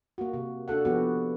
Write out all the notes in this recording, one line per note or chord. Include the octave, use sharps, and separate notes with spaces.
A#3 F#4
C3
D4 F#4 A4 F#5
F3 B3 F#4 G4